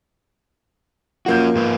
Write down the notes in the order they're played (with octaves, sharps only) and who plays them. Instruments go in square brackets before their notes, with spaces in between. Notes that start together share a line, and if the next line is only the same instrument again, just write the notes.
[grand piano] F3 A#3 G6 [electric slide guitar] C#4 F#4
[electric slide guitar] G#2 F4 B4